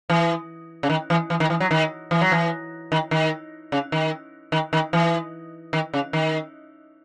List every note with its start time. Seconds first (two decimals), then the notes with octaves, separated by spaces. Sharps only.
0.10 E3
0.83 C#3
0.90 D#3
1.10 E3
1.30 E3
1.40 D#3
1.50 E3
1.60 F#3
1.71 D#3
2.11 E3
2.21 F#3
2.32 E3
2.92 D#3
3.11 D#3
3.72 C#3
3.92 D#3
4.52 D#3
4.73 D#3
4.93 E3
5.73 D#3
5.93 C#3
6.13 D#3